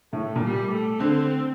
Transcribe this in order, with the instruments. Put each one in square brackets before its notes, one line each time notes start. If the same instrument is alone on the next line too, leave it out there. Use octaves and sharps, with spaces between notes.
[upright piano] A2 [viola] A3
[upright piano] A#2
[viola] G3
A3
[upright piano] D3 [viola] C4